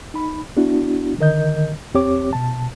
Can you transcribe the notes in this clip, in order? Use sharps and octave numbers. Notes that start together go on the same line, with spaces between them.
D#4 B5
B3 D4 E4 F#4
D3 D#3 A#4 D#5 G6
E2 C4 G4 C#5 D6
B2 A5